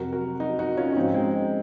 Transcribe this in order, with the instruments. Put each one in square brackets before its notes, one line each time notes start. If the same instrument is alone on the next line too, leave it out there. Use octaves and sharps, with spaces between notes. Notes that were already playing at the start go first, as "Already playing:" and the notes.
Already playing: [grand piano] F2 C3 F#3 F#4 A#4
F#4 A#4
D#4 F#4
D#4 F#4
C#4 F4
C#4
G#2 F3 C4 D#4
G#3 C4